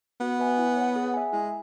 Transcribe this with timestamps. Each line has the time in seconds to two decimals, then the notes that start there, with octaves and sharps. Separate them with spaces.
0.20 B3 F#4
0.40 B4 E5 G#5
0.58 E4
0.77 C#5 F#5
0.96 G#4
1.14 E5 G#5
1.33 G#3 E4